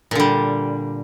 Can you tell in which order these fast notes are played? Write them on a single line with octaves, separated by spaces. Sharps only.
A#2 D3 G3